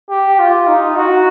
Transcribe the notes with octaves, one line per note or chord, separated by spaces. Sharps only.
G4
F4
D#4
F#4